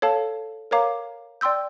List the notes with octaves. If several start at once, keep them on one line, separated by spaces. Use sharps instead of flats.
A4 C#5 F5 A5
A#4 C#5 F5 A#5 D6
D5 G5 C6 E6 G6